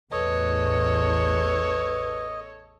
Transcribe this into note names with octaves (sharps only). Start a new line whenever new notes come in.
A1 E2 A4 B4 C#5 D#5